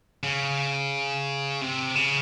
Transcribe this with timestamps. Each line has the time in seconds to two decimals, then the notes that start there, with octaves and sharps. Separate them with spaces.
0.23 C#3
1.61 C3
1.95 C#3